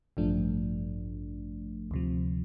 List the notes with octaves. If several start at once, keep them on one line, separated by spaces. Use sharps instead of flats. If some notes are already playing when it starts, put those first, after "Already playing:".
A1 G2 F3 A3 D4
D2 C3 F3